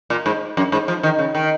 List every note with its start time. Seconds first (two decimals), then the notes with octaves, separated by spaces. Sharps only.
0.10 A#2
0.26 G#2
0.57 F#2
0.72 G#2
0.88 F3
1.03 D#3
1.19 C#3
1.35 D#3